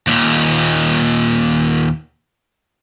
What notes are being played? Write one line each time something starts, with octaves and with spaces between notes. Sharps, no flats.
D#2 A#2